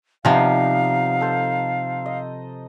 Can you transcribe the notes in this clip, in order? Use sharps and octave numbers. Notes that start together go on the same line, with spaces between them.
C3 F3 G3 B3 D#4 F5
A4 C5
D#5